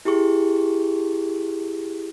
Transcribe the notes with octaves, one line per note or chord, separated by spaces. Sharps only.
E4 G4 G#4 C#6